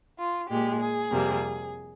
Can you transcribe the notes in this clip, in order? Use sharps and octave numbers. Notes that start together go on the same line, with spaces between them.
F4
A#2 G#3 G4
G#4
F2 C3 G3 A#3